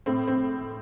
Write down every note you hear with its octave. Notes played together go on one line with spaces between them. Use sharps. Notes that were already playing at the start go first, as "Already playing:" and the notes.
A2 C4
C4